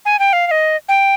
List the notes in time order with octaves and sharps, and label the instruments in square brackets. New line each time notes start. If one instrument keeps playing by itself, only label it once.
[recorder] G#5
G5
F5
F5
D#5
G5